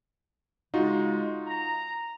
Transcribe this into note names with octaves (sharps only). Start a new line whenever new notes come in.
C#3 G#3 D#4 F4 F#4
A#5